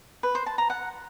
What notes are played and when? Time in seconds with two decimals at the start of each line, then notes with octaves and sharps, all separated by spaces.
0.23 B4
0.35 C5
0.46 A5
0.58 A#5
0.70 F#5